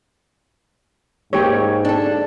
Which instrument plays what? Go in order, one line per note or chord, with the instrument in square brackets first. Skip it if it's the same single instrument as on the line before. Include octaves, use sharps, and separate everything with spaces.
[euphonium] G#2 [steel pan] A#3 G4 C#5
[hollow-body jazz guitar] D4 A4